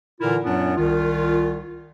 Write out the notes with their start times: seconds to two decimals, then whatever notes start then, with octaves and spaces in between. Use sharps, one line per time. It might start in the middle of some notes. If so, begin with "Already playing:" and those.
0.20 A#2 D3 E3 E4 F4 A#4
0.44 F#2 A#2 F#3 B3 C#4 D4
0.77 C2 D#3 F4